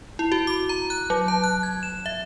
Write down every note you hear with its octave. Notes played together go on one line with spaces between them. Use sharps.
E4
F#4
D6
A#5
F#6
F#3
A5
F#6
G#6
E7
E5